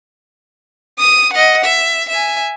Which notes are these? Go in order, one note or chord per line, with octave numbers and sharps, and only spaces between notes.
D#6 D#7
D#5 F#5
E5
E5 G#5